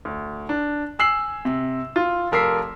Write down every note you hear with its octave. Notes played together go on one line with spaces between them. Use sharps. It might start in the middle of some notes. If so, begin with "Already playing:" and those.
D2
D4
G#5 E6 C7 F#7
C3
F4
F1 F3 A#4 E6 B6 C7